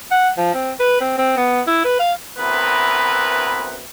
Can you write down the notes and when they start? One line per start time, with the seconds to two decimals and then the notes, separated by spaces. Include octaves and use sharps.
0.11 F#5
0.38 F3
0.54 C4
0.80 B4
1.01 C4
1.18 C4
1.37 B3
1.67 E4
1.84 B4
1.99 F5
2.38 D2 B3 C4 E4 A#4 B4